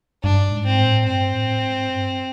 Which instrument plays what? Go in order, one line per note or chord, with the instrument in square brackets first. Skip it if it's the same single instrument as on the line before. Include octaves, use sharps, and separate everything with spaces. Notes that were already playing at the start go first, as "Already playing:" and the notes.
[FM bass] G2 [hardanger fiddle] D4
[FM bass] G#2
[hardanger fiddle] C4
[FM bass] A2
[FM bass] G2 [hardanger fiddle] C4
[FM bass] A2
G#2
G2